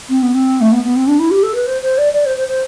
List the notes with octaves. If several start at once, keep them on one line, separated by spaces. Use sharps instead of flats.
C4
B3
C4
A3
B3
B3
C4
D4
E4
G4
A4
B4
C5
C5
D5
D5
C5
C5
C5